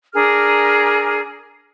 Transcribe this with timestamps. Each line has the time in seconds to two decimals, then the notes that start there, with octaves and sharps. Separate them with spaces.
0.14 D4 G#4 A#4 F6